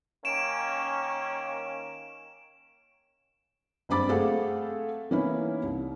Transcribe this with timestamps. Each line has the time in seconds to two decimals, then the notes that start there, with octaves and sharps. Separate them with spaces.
0.25 D#3 A#3 C#4 D7 E7
3.89 F#1 G2 C4 B5 D6 A6
4.09 A3 C4 G#4 A4 F5 F#5
5.11 E3 A#3 B3 C#4 D#4 E4
5.63 C2